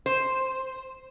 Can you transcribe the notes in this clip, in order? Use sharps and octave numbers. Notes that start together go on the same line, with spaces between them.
C5